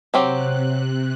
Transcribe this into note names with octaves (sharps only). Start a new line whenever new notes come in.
C3 F#3 C4 G4 F#6